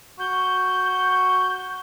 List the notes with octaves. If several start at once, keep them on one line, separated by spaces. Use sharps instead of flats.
F#4 G6